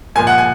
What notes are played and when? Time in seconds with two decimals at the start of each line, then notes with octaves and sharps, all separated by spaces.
0.15 A#2 F3 G#3 G#5
0.27 F#5
0.38 G#5